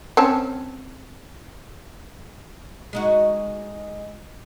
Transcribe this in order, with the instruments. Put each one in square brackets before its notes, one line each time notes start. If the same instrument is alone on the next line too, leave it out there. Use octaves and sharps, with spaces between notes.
[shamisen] C4 C#4 A5
[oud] G#3 D#4 F#4